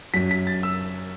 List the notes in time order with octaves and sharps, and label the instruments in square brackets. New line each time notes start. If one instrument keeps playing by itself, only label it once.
[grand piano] F#2 F#3 B6
B6
A6
E6